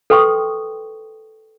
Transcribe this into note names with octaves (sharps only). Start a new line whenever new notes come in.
A4 B4 G5 C6 C#6 D#6